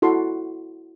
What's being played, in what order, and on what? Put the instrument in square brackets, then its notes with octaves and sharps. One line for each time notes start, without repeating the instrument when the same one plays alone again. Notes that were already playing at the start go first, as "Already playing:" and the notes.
[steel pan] E4 F#4 A4 C6